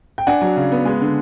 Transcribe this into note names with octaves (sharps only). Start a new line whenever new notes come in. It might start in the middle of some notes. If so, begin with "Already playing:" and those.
G5
D4 F#5 G#5
F#3
C#3
B3
G#3
D3